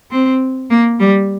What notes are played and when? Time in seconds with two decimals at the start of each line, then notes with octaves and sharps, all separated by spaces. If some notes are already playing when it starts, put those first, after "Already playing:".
0.11 C4
0.70 A#3
1.00 G3